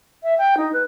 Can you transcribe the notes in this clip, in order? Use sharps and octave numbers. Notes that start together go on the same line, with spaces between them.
E5
G5
D#4
B4